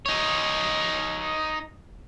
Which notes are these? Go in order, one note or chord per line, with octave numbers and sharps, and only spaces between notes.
D#4 C#5